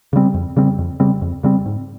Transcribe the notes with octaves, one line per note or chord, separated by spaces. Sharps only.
C#3 G3 C4
F2
C#3 G3 C4
F2
C#3 G3 C4
F2
C#3 G3 C4
G#2